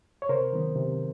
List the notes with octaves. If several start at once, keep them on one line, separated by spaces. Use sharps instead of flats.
C#5
C3 A#4 C5
D#3 F#3 B3
C3